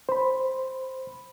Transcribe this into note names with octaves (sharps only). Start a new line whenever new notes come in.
C5 B5